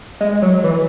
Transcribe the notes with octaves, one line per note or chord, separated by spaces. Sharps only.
G#3
F#3
E3